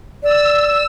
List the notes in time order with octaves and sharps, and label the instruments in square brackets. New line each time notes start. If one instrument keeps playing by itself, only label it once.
[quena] D5 [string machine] E6